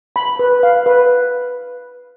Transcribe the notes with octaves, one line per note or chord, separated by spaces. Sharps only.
B5
B4
F5
B4